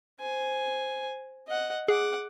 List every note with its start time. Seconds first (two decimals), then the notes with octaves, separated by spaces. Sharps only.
0.21 C5 G#5
1.48 D#5 F#5
1.88 G#4 F#5 D6